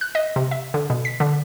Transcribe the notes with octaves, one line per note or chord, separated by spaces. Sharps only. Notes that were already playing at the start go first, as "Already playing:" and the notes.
F#6
D#5
C3
E5
D3
B2
B6
D3